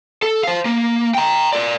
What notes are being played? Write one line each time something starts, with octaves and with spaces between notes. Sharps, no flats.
A4
C5 F5
A#3
G5 A#5
A#4 D5